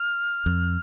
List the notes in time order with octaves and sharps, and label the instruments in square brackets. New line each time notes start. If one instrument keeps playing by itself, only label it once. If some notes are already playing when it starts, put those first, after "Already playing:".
Already playing: [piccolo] F6
[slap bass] F2